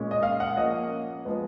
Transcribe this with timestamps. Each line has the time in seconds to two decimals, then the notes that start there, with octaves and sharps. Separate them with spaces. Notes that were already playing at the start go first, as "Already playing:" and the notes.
Already playing: A#2 G#3 C#4
0.11 D#5
0.23 F5
0.40 F#5
0.57 F3 A#3 C#4 D#5
1.25 F3 G#3 B3